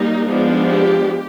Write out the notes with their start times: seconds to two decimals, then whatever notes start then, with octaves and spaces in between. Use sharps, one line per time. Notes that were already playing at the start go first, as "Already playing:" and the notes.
Already playing: G3 A#3 D#4
0.26 F3 G#3 B3 D4
0.66 G4